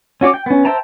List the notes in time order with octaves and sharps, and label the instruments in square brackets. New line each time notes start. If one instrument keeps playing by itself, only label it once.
[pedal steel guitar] C#4 F#4 C#5 D6
G5
B3 C#4
C5 E5 G5 A5 A#5